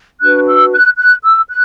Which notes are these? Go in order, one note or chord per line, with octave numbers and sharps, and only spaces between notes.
D4 F#4 B4 F#6
E6
F#6
F#6
E6
F#6